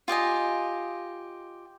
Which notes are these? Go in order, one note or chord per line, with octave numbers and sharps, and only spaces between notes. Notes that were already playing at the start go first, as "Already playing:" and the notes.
F4 G4 D#5 G#5